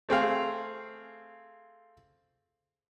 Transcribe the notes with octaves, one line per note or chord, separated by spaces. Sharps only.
A3 C4 G#4 F5